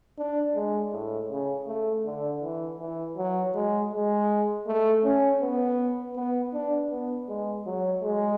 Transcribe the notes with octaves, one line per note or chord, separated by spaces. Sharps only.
D4
G#3
A2
C#3
A3
D3
E3
E3
F#3
G#3
G#3
A3
C#4
B3
B3
D4
B3
G#3
F#3
G#3